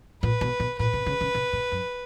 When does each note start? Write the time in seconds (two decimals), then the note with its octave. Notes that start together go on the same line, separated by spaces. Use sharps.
0.22 A#2 B4
0.41 B2
0.60 B2
0.79 A#2 B4
0.93 C3
1.06 C#3
1.21 C#3
1.35 C3
1.53 B2
1.72 F#2